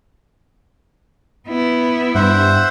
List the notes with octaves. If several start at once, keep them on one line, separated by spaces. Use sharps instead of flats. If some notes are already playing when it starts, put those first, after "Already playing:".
B3 E4
G2 C5 E5 F#5